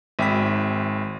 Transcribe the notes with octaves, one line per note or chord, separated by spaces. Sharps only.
G#1 E5 G5 B5 B6